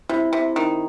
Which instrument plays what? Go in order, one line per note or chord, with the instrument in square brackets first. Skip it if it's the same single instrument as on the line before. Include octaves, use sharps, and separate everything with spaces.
[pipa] C3 [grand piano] E4
[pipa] C3
D#3